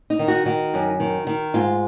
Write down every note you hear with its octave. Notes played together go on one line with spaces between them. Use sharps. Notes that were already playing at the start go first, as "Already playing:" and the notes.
D#4
D#3
F#4
D#3 F#4
F#2
D#3
D#3
G#2 F4